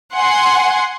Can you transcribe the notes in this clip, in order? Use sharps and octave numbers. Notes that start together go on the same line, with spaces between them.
F#5 G#5 C6